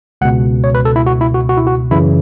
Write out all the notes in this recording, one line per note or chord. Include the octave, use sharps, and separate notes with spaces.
C#2 B2 F#5
C#5
B4
A4
E4
F#4
E4
F#4
F#4
E4
F#4
F#2 C#3 E3 E4